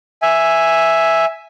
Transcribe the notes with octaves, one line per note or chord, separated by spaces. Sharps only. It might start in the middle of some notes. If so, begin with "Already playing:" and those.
E5 G#5